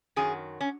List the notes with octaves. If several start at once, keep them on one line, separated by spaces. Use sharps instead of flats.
F#2 D#3 F#3 G#4
C#4